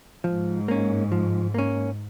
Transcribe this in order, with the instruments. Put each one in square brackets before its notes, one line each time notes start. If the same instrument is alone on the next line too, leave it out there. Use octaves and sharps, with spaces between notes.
[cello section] G#2 [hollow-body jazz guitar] F3
[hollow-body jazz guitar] A#3 C#4
F3
A#3 C#4